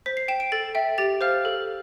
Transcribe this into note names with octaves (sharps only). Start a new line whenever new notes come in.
C5 B6
C7
G5 E7
D7
A4 A6
E5 G5
G4 A6
C5 F5 F6
A4